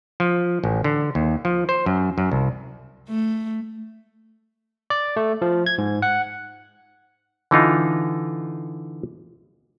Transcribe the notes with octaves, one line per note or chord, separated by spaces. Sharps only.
F3
A1
D3
D#2
F3
C5
F#2
F#2
C2
A3
D5
A3
F3
G#6
G#2
F#5
D3 E3 D#4 F4